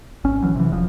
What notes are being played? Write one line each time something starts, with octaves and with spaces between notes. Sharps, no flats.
G#1 C#4
A#1 E3 F#3
C3 E3
E1 F3